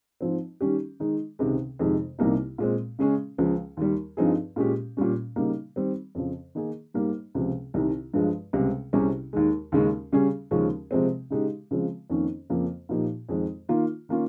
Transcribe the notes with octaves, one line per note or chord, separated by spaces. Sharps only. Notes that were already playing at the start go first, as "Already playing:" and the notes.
G#2 F3 C4
D#3 G3 C#4 G4
D#3 G#3 D#4
C#2 C3 D#3 G#3
F2 C3 D#3 G#3
C2 C3 G3 A#3 D#4
A#2 G#3 C4
C#3 G#3 C#4 G#4
C#2 C#3 F3
D#2 D#3 G3
G2 F3 C4 D#4 G#4
A#2 G#3 C#4 G4
A#2 G3 C#4
C#3 G3 A#3 D#4
D#3 G3 C4
F2 C#3 F3
D#3 A#3 D#4 G#4
G#2 G3 A#3
C#2 C3 F3
C2 C3 D#3
G2 F3 G#3
C#2 C3 G3
C2 C3 G3 C#4 G#4
D#2 D#3 G#3
D#2 C#3 G#3 C#4
C#3 G3 C#4 G#4
D#2 C#3 F3 G#3 C#4
C3 F3 G#3 C4
C#3 G#3 D#4 G4
C#3 F3 G#3 C4
F2 D#3 A#3 C#4
F2 C#3 F3 A#3
A#2 F3 A#3 D#4 G4
F2 D#3 G#3 C4
D#3 A#3 F4
D#3 A#3 C#4 F4